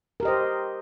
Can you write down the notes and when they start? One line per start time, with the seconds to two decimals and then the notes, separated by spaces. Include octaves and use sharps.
0.20 A#4
0.23 G4
0.25 D#5
0.28 C5